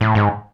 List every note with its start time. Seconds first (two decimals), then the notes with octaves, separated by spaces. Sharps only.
0.01 A2
0.15 G#2